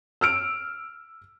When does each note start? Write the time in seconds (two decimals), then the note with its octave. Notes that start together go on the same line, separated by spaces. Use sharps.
0.21 E6 F6 D7